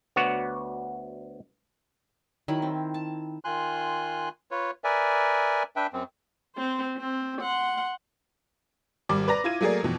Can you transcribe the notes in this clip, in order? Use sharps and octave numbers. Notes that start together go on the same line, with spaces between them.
D2 B3 F#4 C#5 D5 F#5
D#3 F#3 E4 B5
C4
A5
D#3 F4 G#5 C6 F#6
F4 B4 C#5
A#4 B4 D5 E5 G#5
D4 B4 E5 G5
F#2 C4
C4 C5
C4
F#5 C6
G#1 G3 D6
B4 D5 A#5 A#6
E4 F4 G#6 D#7
F#3 A3 A#3 G#4 A#4 D5
F2 B2 E3